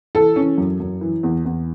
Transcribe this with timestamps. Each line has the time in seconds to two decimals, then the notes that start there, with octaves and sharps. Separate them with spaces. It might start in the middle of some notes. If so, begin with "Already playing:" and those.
0.15 E3 A4
0.36 E3 C#4
0.58 F#2
0.80 F#2
1.01 E3
1.23 E2
1.45 E2